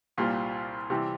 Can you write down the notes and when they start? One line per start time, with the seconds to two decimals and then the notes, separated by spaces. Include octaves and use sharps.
0.18 C2 A#2 G3 C4 F4
0.90 C3 E3 G3